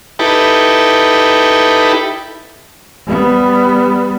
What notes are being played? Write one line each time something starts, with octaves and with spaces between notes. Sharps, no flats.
D#4 E4 G4 A4 B4
G3 B3